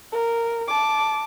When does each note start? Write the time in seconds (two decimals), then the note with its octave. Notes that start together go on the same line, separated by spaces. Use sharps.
0.12 A#4
0.68 A5 D6